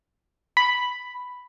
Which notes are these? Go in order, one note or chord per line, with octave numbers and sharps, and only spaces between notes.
B5